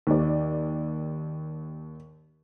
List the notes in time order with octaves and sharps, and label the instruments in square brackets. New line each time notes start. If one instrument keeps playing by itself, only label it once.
[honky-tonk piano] D#2 D5